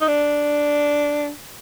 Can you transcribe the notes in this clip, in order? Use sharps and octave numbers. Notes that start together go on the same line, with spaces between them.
D#4
D4